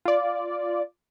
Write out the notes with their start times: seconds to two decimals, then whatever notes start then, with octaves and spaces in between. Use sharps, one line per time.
0.05 F4 D5